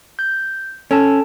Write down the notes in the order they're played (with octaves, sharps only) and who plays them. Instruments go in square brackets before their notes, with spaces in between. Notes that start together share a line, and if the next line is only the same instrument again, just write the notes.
[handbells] G6
[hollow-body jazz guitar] C#4 [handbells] A4 A5